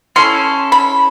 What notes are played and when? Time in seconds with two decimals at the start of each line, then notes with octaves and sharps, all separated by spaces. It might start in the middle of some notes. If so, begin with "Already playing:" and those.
0.16 C#4 E4 A4 C6
0.72 B5